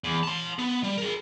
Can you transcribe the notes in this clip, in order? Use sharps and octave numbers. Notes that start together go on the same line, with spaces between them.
E2
A5 C6
B3
G3
G#4 A#4